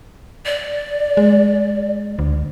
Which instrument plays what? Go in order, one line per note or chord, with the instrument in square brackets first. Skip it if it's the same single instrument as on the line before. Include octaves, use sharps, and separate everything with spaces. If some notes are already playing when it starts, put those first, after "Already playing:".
[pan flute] D5
[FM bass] G#3
D2